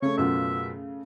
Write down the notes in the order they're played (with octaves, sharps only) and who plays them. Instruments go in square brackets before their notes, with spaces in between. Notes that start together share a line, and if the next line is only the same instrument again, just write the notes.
[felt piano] C#3 A3 [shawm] C#5
[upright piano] F#2 B2 F4 [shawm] E5